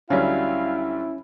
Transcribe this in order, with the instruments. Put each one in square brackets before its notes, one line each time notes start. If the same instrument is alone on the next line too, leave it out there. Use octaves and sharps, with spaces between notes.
[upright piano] D2 F#3 G3 [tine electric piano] C#4 [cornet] E4 [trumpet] F5